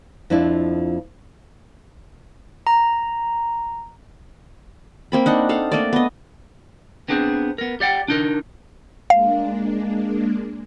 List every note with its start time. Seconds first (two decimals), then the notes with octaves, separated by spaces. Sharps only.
0.30 F2 F3 D4 E4 F4
2.67 A#5
5.12 A#3 C4 B5
5.26 D4 D#4 F#5
5.49 A4 F5 F#5
5.72 A3 A#3 D5
5.93 B3 D#5
7.08 B3 C4 D4 G#4 A4 C5
7.58 B3 A#4
7.80 G4 D5 F#5 G5
8.08 D4 D#4 A#4
9.10 G#3 A#3 D4 F5